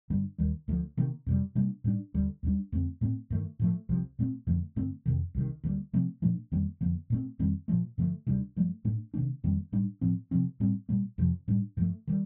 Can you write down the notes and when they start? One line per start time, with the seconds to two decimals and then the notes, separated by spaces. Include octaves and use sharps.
0.10 G2 D3 G3 D4
0.38 D#2 D#3 G3
0.68 D2 D3 F3 A3
0.97 C3 D#3 A#3
1.26 F2 C3 G3
1.55 C3 G3 A#3 D4
1.84 A2 G3 A#3 D4
2.14 D#2 D3 G3
2.43 D#2 D3 G3 D4
2.72 F2 D3 A3 C4
3.01 A2 A3 C4
3.30 G2 D#3 A3
3.59 A2 F3 A3
3.89 C2 C3 F3
4.19 A#2 A3 C4
4.47 F2 D3 F3 A3
4.76 G2 D3 A3 C4
5.06 F2 C3 D#3
5.35 C2 C3 D#3
5.64 D2 D3 G3 A#3
5.93 C3 F3 A3 C4
6.22 A#2 F3 A3 D4
6.52 F2 D#3 G3 A#3
6.81 F2 D3 F3 A#3
7.10 A#2 A3 C4
7.39 F2 D#3 G3 C4
7.68 A#2 F3 A3
7.98 G2 D3 F3 A3
8.27 D2 C3 G3 D4
8.56 G2 F3 A3
8.85 A2 A3 D4
9.14 C3 D#3 A3 D4
9.44 F2 D#3 G3 A#3
9.72 A2 G3 D4
10.01 A2 F3 C4
10.31 C3 F3 C4
10.60 A2 G3 C4
10.89 A#2 G3 A#3
11.18 F2 C3 F3
11.48 A2 G3 D4
11.77 G2 F3 A3
12.07 D#3 G3